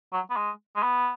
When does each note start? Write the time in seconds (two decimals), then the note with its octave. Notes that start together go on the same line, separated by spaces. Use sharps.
0.13 F#3
0.30 B3
0.36 G#3
0.76 G#3
0.83 B3